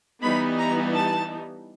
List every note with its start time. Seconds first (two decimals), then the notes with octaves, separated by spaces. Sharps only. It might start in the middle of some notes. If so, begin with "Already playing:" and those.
0.23 E3 G3 B3 D#4 B5
0.58 A#5
0.94 A5